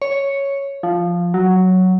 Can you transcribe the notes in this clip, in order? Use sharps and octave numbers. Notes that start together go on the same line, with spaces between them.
C#5
F3
F#3